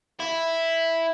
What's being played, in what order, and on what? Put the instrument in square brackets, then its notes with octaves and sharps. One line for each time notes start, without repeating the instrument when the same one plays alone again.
[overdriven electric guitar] E4